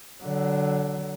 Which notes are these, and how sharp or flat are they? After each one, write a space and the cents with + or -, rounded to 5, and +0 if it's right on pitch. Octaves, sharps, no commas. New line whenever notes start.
D3 +0 F#3 +25